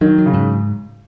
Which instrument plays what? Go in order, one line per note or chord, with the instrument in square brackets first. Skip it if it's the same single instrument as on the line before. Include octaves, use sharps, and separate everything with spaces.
[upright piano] D#3 [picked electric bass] F#3
[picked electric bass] F#3
[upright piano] C#3
[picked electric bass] G#2